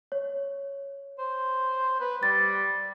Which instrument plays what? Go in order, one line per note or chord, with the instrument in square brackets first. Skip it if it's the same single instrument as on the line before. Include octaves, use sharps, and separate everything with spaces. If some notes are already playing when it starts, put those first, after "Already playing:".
[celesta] C#5
[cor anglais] C5
B4
[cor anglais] G3 [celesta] A6